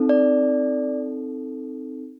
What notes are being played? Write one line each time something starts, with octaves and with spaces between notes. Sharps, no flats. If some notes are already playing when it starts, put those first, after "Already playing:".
Already playing: C4 D#4 A4
D5